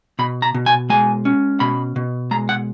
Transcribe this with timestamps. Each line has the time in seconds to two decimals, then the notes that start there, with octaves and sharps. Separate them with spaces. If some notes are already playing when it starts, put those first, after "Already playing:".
0.19 B2 B5
0.42 A#5
0.54 B2
0.66 G#5
0.90 G#3 G#5
1.25 C#4
1.60 B2 B5
1.96 B2
2.31 G#3 A#5
2.49 F#5